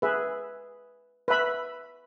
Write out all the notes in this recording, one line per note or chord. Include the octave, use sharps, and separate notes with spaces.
G#4 B4 E5
B4 E5 B5